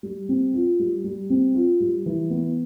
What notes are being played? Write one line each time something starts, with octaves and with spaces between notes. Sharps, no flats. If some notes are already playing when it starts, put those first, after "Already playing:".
G3
C4
F4
G3
G3
C4
F4
G3
E3
B3